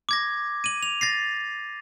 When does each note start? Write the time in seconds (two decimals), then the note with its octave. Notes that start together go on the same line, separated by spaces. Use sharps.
0.09 D6 G#6 A#6
0.64 D#7 F#7
0.83 F7
1.01 A6 A#6 C7